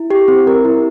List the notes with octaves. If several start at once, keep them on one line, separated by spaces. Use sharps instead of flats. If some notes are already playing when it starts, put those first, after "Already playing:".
Already playing: E4
G4
C4
A#4
E4